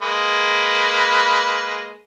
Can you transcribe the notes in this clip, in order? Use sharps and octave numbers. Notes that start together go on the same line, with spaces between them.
G#3 A#3 B4